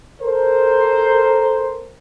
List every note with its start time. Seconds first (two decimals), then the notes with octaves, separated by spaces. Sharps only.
0.21 A4 A#4 C5